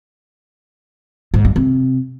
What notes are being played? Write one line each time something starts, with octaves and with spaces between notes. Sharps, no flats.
G#2
G2
C3